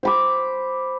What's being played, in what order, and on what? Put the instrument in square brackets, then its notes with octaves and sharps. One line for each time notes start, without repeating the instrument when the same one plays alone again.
[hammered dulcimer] C5 B5 D6